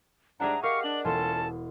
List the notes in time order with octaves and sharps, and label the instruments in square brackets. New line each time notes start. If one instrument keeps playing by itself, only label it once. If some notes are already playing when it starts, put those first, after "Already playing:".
[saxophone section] G#2 G3 D4 [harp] G#4 E5 F#5 [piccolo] A#5
[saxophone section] G4 F5 [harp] A#4 D#5 [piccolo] C#6
[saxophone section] D4 [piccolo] F#7
[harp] E1 B3 C6 [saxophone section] C#4 F4 A4 [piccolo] A5